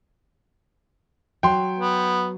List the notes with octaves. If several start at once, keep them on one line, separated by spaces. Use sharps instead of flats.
F#3 G5 C6
B3